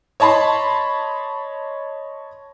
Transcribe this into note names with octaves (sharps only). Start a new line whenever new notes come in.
C#5 D#5 A5 B5 C6